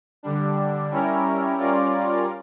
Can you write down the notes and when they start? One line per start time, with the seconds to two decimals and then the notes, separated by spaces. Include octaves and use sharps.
0.23 D3 G3 D4
0.91 G3 C#4 E4 A#4
1.58 G3 C#4 F4 A#4 D5